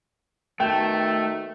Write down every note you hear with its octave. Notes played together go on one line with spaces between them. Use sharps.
D#3 A3 B3 F#4 G5